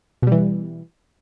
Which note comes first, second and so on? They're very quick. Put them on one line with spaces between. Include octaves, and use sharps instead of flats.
B2 G3 E3